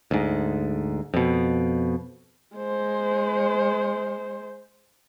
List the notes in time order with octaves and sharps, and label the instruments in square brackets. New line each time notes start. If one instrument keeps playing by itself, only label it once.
[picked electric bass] D2 G#2
F2 B2
[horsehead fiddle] G#3 C5